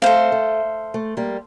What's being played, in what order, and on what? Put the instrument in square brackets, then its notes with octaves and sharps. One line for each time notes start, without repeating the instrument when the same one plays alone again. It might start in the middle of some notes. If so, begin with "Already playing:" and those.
[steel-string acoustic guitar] A3 C4 [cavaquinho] A4 C5 F5
[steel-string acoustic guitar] A3
A3
G3 A#3